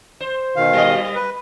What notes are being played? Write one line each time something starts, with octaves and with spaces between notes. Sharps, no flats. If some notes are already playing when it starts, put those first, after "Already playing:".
C5
B2 D#3 F5
G3 D#5
B4